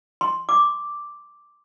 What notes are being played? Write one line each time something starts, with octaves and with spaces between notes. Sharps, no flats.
C6
D6